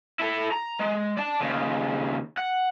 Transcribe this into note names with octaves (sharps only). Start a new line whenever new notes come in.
E4 A4
A#5
G#3
D5 A5
D#2 C#3
F#5